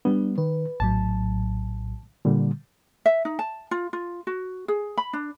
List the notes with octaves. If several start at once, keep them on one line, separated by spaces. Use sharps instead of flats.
G3 B3 D4
D#3 B4
A#1 A2 F#3 A5
A#2 D3 G3
E5
D#4
A5
F4
F4
F#4
G#4
B5
D4